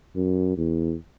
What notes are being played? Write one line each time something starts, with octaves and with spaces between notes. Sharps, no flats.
F#2
E2